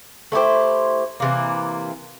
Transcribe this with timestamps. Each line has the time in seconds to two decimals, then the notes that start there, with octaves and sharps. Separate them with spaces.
0.32 A3 E4 G4 C5
1.20 C3 E3 A#3